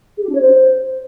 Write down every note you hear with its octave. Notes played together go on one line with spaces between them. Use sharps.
G#4
G4
D4
C#5
C5